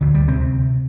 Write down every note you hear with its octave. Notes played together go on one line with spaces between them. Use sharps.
D2 D3
G3
C3 C4